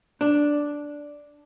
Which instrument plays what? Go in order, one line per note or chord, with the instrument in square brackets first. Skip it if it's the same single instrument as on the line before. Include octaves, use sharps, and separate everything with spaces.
[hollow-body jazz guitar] D4